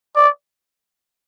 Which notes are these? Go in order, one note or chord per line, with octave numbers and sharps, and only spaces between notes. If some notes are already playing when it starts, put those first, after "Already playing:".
D5